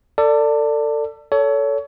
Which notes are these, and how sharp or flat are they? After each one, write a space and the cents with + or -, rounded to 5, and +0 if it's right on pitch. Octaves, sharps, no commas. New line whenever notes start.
A4 +30 D5 +0
A4 +0 C#5 +30